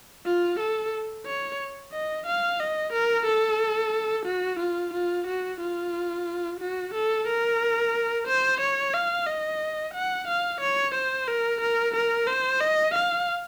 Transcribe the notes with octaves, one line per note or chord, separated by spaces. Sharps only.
F4
A4
C#5
D#5
F5
D#5
A#4
A4
F#4
F4
F4
F#4
F4
F#4
A4
A#4
C5
C#5
F5
D#5
F#5
F5
C#5
C5
A#4
A#4
A#4
C5
D#5
F5